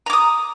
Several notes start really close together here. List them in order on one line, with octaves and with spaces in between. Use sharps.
A#5 D6 D#6